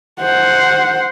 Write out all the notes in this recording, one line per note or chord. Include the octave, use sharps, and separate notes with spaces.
C5 F#5